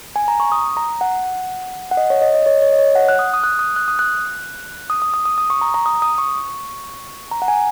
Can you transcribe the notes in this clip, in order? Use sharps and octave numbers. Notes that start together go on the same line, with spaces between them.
G#5
A#5
C#6
D#6
A#5
F#5
F#5
D#5
C#5
D#5
D#5
C#5
C#5
D#5
C#5
F#5
F#6
D#6
D#6
F#6
D#6
F#6
D#6
F#6
D#6
D#6
D#6
D#6
D#6
C#6
A#5
A#5
D#6
D#6
C#6
A#5
F#5
G#5